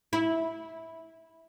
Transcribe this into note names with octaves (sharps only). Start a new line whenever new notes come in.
E4